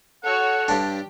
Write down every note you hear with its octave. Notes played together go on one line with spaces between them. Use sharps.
F#4 A4 C#5 F#5
G2 D4 G4